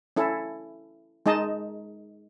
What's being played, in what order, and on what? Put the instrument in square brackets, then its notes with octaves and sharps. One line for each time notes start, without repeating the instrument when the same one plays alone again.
[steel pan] C#4 E4 A4
G#3 D#4 D#5 A5